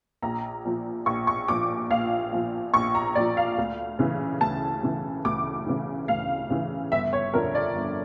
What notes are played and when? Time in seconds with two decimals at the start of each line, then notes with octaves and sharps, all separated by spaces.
0.22 A#1 A#5
0.65 A#2 F3
1.06 A#1 C#6
1.27 C#6
1.48 A#2 F3 D6
1.90 A#1 F5
2.32 A#2 F3
2.74 A#1 C#6
2.95 A#5
3.15 A#2 F3 D5
3.37 F5
3.58 D2
3.99 C#3 E3
4.41 D2 A5
4.83 C#3 E3
5.25 D2 D6
5.66 C#3 E3
6.08 D2 F5
6.50 C#3 E3
6.92 G1 E5
7.13 C#5
7.34 F2 D3 A#4
7.55 D5
7.76 G1